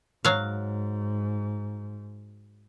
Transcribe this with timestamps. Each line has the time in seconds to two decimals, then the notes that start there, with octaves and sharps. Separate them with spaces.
0.25 G#2 F#3 F5